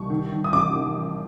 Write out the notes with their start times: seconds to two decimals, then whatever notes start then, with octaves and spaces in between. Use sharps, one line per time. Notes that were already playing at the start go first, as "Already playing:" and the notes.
Already playing: C2 C#6
0.10 D#3
0.32 D#3
0.44 D#6
0.52 A1 D6